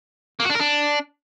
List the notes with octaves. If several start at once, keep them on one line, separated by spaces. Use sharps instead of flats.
A#3
F#4
D4
A#4
D4